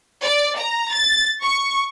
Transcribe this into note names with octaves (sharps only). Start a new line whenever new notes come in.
D5
A#5
A6
C#6